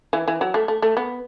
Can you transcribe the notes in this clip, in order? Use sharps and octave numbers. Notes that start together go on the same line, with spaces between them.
E3
E3
F#3
A3
A3
A3
B3